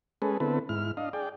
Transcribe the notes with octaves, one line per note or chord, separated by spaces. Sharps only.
G#3 C#4 G#4 A4 B4
D3 B3 C4 E4 A4 B4
G#2 E4 F6
D4 D#5 F5
G#4 D5 G5